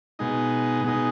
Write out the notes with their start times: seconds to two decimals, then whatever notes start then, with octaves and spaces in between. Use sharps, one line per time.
0.19 B2 G#3 D#4
0.84 B2 G#3 D#4